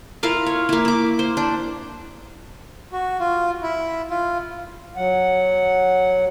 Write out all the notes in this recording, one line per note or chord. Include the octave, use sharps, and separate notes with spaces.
E4 F4 A#4 F5
C#5
A#3 E4
E4 D6
C5
D4
F#4
F4
E4
F4
F#3 F#5